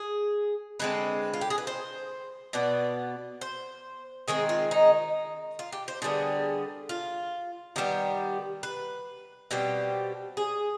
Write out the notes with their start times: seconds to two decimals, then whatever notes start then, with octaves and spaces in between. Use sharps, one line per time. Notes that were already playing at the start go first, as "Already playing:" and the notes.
Already playing: G#4
0.79 D3 G#3 C4 B4
1.34 F4
1.41 G4
1.50 G#4
1.58 B4
1.67 C5
2.53 B2 B3 D5
3.41 C5
4.28 D#3 G#3 C4 G#4
4.49 F4
4.71 D#4
5.59 F4
5.72 G4
5.88 C5
6.02 D3 G3 B3 G#4
6.89 F4
7.76 D#3 G3 B3 G4
8.63 B4
9.51 B2 G3 C4 G4
10.37 G#4